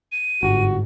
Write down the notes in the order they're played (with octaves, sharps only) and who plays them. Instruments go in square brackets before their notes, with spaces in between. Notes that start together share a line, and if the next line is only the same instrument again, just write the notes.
[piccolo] D#7
[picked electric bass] G1 [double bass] G#2 [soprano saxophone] F#4